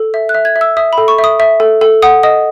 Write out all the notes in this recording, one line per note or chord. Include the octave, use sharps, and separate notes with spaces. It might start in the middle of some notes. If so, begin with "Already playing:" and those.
Already playing: A4
E5
F#6
E5
G#6
E5
E6
E5 D#6
B5
A4
C#6
E5
D#6
E5
A4
A4
F#5 D#6
D#5 D#6